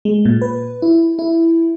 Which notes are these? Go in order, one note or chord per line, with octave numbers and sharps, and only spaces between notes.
G#3
A#2
B4
E4
E4